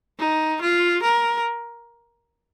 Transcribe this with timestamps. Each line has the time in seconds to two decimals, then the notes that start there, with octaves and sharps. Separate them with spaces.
0.19 D#4
0.61 F4
1.02 A#4